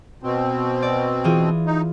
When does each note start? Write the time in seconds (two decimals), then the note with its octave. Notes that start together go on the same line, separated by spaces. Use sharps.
0.23 B2 C4
0.83 D5
1.24 E3 F4 G#4
1.66 D#4